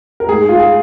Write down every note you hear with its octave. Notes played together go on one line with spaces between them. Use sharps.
A#4
G#2 G#4
F4
G#4